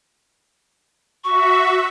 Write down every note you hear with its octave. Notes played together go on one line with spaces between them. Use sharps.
F#4 E5 C#6